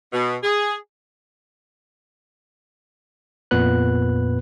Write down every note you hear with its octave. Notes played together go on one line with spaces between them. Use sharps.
B2
G#4
F2 A#2 B3 B4 F#6